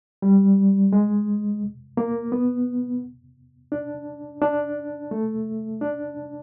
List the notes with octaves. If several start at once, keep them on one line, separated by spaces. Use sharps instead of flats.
G3
G#3
A#3
B3
D4
D4
A3
D4